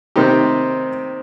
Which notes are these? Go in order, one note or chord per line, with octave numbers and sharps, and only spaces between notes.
C3 D#3 C4 D#4 G4